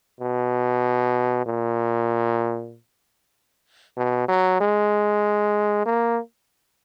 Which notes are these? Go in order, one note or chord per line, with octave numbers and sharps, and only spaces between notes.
B2
A#2
B2
F#3
G#3
A#3